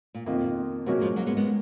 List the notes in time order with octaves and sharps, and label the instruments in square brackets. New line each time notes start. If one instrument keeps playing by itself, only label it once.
[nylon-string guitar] A#2
[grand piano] F2 D#3 A#3 F4 [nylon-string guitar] B2
[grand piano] G#2 F#3 A#3 C#4 F#4 [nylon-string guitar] B2
[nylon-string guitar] F3 G#3
F#3 A#3
G#3 B3
G#3 B3